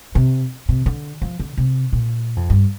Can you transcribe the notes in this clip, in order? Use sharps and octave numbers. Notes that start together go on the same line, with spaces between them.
C3
C3
D3
F3
D3
C3
A#2
F2
G2